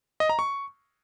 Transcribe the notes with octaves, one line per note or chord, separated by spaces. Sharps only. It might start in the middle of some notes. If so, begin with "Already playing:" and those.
D#5
A#5
C#6